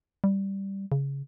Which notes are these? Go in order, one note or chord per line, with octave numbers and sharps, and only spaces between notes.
G3
C#3